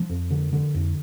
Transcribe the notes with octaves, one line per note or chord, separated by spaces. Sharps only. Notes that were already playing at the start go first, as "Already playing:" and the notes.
Already playing: F3
F2
D3
D3
F2